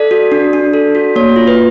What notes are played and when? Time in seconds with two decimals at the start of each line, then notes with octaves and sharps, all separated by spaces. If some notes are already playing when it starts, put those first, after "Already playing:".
Already playing: A4 D5
0.11 F#4
0.32 D4
0.53 D4
0.73 A4
0.95 F#4
1.16 A#3 C#5
1.36 F4
1.47 B4